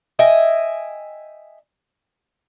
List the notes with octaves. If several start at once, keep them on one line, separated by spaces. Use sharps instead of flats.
D#5 E5 G5 G#5